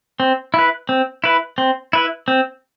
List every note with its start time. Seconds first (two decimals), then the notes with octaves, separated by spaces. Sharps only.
0.20 C4
0.54 E4 B4
0.89 C4
1.24 E4 B4
1.58 C4
1.93 E4 B4
2.28 C4